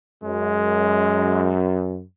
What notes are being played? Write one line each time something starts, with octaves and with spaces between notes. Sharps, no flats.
F#2 G#3